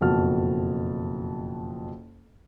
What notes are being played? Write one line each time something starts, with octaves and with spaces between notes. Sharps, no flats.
F#1 F2 B2 F#4 A5 F6